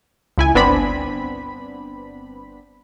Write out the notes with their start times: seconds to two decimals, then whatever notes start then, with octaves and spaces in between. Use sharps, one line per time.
0.38 C#2 E4 G#5
0.55 G1 B3 C4 D4 B5